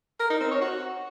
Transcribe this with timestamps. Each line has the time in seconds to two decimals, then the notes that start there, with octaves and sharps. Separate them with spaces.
0.20 A#4
0.30 D#4
0.41 C4
0.51 C#5
0.61 F#4